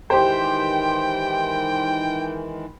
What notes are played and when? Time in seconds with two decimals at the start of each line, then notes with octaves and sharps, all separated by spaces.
0.10 D#3 E3 G#3 G4 C5 G5